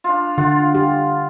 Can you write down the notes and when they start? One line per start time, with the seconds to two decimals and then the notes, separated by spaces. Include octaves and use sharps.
0.04 D4 F4
0.38 D3 F4 F#5
0.74 G4